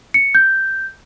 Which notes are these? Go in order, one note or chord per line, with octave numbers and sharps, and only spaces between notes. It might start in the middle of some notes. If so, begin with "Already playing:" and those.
C#7
G6